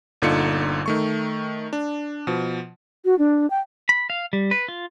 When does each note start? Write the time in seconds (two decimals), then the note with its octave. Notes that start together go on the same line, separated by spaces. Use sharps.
0.22 G1 A#2 D3 D#4 F4 C#7
0.86 D#3 A3 C#6
1.73 D4
2.27 B2 F3
3.05 F#4
3.19 D4
3.50 G5
3.89 B5
4.10 F5
4.33 G3
4.51 B4
4.68 F4